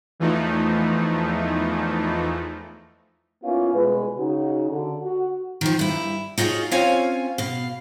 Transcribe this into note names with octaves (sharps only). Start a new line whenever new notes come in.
E2 E3 F3 A3 D#4
A#3 B3 C#4 E4 F4
C2 B2 G#3 B4
C#3 D#4 F#4
D3
F#4
D#3 F3
G2 E4
D#4 F4 F#4 G#4 C#5
C4 C#4 F4 C#5 F5 G#5
B2 F5